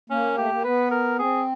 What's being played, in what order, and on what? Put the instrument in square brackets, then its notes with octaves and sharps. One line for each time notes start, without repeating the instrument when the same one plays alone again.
[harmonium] A#3 [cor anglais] C#4
[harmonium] A3 [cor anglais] G4
[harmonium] A#3
[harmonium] B3 [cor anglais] B4
[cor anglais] A#4
[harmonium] C4 [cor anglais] G#4